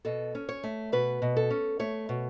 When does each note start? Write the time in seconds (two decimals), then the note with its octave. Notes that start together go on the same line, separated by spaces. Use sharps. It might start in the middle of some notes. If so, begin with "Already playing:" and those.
0.05 B2 A4
0.35 C#4
0.49 C#5
0.64 A3
0.92 B2 B4
1.22 B2
1.37 A4
1.50 C#4
1.79 A3 C#5
2.09 B2